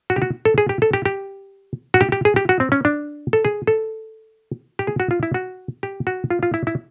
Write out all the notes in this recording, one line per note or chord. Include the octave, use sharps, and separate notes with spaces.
F#4
G4
F#4
A4
G#4
G4
A4
G4
G4
F#4
G4
G4
G#4
G4
F#4
C4
C#4
D4
A4
G#4
A4
G4
G#4
F#4
F4
E4
F#4
G4
F#4
F4
F4
E4
E4